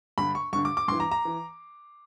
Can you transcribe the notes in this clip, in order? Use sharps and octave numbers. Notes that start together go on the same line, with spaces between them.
G2 D3 B5
C#6
G2 D3 C#6
D6
D6
G2 E3 C6
A#5
A#5
E3